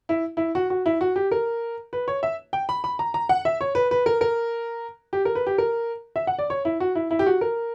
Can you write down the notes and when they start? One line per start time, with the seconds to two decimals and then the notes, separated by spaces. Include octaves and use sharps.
0.09 E4
0.37 E4
0.55 F#4
0.70 F#4
0.86 E4
1.01 F#4
1.16 G4
1.31 A#4
1.93 B4
2.08 C#5
2.23 E5
2.53 G5
2.69 B5
2.84 B5
2.99 A#5
3.14 A#5
3.29 F#5
3.45 E5
3.61 C#5
3.75 B4
3.91 B4
4.06 A#4
4.21 A#4
5.13 G4
5.25 A#4
5.35 B4
5.47 G4
5.58 A#4
6.16 E5
6.27 F#5
6.39 D5
6.50 C#5
6.65 E4
6.80 F#4
6.95 E4
7.11 E4
7.19 G4
7.26 F#4
7.41 A#4